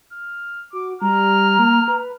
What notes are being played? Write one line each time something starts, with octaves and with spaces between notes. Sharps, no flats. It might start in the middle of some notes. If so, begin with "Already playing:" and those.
F6
F#4 D6
G3 A#5 F6
A#3
B4